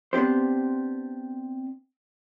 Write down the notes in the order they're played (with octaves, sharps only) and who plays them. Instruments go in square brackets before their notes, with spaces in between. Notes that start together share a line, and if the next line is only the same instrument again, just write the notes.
[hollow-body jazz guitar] B3 C4 D4 G4 C5